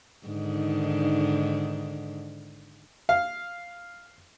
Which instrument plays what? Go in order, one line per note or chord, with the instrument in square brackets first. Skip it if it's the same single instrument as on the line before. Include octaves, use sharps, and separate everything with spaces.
[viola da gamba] G#2 D3 D#3
[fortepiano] F5